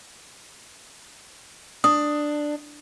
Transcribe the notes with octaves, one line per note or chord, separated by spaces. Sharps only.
D4 D#6